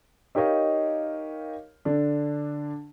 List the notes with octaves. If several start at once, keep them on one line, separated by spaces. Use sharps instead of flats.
D#4 G4 A#4 C#5 D#5 F5
D3 D4